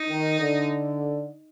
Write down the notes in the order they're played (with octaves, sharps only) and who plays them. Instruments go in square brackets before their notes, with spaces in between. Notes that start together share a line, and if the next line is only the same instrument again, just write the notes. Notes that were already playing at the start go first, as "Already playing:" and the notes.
Already playing: [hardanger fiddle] D#4
[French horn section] D#3
D3